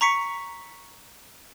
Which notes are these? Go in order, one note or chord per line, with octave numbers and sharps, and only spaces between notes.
A#5 C#6 B6 C#7